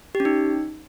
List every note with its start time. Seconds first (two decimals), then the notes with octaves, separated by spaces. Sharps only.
0.15 G4
0.20 C#4
0.25 D#4